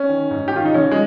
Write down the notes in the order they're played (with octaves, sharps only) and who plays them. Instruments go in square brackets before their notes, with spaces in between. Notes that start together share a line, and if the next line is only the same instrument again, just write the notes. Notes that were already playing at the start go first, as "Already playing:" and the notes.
Already playing: [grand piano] C#4
D#3
G#2
G4
D#3 F4
D#4
A#1 C#4
G#3